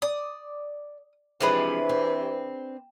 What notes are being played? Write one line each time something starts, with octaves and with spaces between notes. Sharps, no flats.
D5 D#6
C3 E3 F3 G#3 C4 D4 G#4 B4
C4